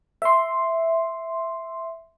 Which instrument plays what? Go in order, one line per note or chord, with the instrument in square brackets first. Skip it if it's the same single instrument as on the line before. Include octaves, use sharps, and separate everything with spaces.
[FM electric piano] E5 C6